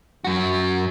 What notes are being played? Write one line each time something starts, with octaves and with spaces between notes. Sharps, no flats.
F#2 F#4